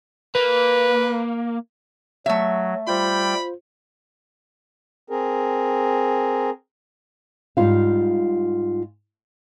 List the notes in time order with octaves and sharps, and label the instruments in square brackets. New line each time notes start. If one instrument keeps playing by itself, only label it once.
[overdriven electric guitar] A#3 [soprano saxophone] B4
[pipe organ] F#3 [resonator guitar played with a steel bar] A3 E5
[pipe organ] G3 G5 [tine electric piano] F4 C5 [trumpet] B5
[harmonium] C4 G#4 A#4
[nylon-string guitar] G#2 G3 F4 F5